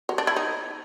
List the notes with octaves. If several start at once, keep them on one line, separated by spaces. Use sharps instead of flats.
F#3
D4
E4
D#4